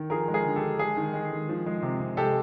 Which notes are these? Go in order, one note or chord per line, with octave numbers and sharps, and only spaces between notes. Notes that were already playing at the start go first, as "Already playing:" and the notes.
Already playing: D#3
F3 G#4 A#4
G#3
G#4 A#4
D3
G4 A4
D3
G#3 G#4
D#3
G#3
D#3
F3
G#3
C3
C3
G#3 G4 A4